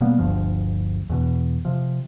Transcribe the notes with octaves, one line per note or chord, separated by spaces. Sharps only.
B2 G3 A#3 B3
G1 D2 G2 F3
E2 B2
C3 F3